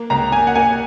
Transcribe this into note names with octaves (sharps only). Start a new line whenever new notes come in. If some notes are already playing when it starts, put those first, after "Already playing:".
Already playing: A#3
C#2 A#5
A#3 G#5
F#5
A#3 G#5